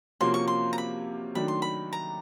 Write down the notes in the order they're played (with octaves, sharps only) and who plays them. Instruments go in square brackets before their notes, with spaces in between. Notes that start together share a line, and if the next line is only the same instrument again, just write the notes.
[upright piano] C3 F3 A#3 C#4 F#4 [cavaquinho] C6
[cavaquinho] C#6
C6
A#5
B5
[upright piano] D#3 F#3 A3 D4 [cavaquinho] B5
[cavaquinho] C6
B5
A#5